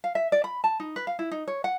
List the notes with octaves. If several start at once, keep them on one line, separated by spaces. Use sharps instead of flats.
F5
E5
D5
B5
A5
D#4
B4
F5
E4
D#4
C#5
F#5